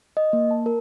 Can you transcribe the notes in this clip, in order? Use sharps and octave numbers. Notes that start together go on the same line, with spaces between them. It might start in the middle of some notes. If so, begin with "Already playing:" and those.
D#5
A#3
A5
A#4